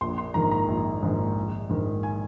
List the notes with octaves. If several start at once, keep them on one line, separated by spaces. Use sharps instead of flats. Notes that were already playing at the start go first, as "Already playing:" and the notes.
A#1 C6
C6
G#2 D#3 A#5
A#5
A#1
G#2 D#3
A#1
G#2 D#3
G#5